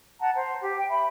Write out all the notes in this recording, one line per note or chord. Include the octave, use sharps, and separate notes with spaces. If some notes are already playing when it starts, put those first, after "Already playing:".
F#5 A5 A#5
C5 A#5
G4
G5
E5 B5